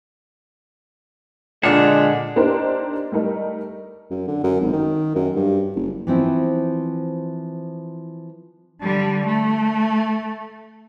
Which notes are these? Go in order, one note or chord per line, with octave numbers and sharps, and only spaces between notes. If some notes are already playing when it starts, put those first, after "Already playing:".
A#2 D3 G#3 D4 G#4 F#5 A5
A#3 D4 D#4 G4 A#4 C5
G3 A3 D#4 A#4
F#2
D3
F#2
G#1
D#3
F#2
G2
F#1
E3 F3 C4 E4
D3 G3
A3